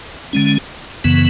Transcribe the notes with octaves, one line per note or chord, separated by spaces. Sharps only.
D3 G#3 C#4
F#2 C#3 E3 B3